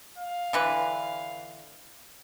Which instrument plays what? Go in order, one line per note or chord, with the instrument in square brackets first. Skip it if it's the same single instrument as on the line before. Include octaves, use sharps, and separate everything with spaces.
[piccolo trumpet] F5
[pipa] D3 E3 B4